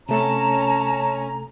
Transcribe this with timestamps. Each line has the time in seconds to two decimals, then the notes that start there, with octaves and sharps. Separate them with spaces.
0.09 C3 A3 C#4 A4 A5 A#5